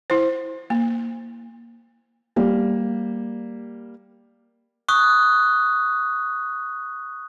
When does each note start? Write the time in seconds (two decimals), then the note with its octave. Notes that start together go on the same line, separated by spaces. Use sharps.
0.10 E4 C5
0.70 A#3
2.36 G3 A#3
4.89 C#6 D#6 F#6